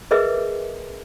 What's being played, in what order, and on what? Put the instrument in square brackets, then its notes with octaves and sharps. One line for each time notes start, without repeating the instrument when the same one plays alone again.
[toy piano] G#4 A#4 B4 D#5 E5 D6